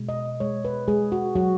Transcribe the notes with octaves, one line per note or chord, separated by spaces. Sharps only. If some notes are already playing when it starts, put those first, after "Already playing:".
Already playing: B2 G#3
D#5
G#3 C#5
B4
G#3 G#4
F#4
F#3 F#4